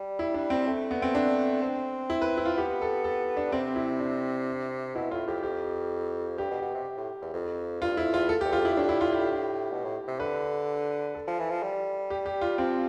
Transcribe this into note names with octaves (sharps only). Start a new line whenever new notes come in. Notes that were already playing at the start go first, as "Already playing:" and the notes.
Already playing: G3
E4
D4
C4
A3
B3
C4
D4
C4
E4
B4
E4
F4
B3 G4
A4
A4
D4
C3 C4
E4
D4
B2 E4
A2 F4
F2 G4
F2 G4
G2 G4
B2
B2
C3
A2
E2
F2
G2 F4
F2 E4
E2 F4
A4
G4
E2
F4
F2 E4
A2 D4
E4
F4
G4
B2
A2
C3
D3 B4
A4
F3
E3
F3
G3
G4
G4
F4
F3 C4